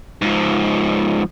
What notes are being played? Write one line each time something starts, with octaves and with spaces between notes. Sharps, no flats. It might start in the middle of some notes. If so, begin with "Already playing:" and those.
G#2 F3